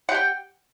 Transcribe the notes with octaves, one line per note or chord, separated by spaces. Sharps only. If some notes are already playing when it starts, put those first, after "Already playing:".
G4 F#5 G5